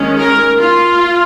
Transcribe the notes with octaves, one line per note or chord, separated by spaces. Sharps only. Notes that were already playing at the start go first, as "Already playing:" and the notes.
Already playing: D#3 G#3 C#4
A#4
F4